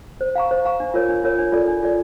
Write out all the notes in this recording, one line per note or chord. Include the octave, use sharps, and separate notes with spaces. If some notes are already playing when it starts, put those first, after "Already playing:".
C5
F5 A#5 C#6
C5
F5 A#5 C#6
D4
F4 A#4 C#5
D4
F4 A#4 C#5
D4
F4 A4 D5
D4
F4 A4 D5